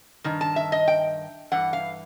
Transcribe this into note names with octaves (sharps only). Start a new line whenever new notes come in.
G2 D#3
A5
E5
D#5
G5
G2 E3 F#5
F5